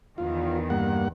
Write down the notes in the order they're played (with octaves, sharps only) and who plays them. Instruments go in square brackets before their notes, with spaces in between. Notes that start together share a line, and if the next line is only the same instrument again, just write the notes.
[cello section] E2 D#3 [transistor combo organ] F4
[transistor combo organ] G2 A#3 F#5